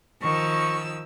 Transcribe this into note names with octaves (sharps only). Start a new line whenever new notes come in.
D#3 F3 C#6 E6